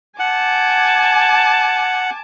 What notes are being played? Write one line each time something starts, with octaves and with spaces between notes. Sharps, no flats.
F#5 G#5 A5 D6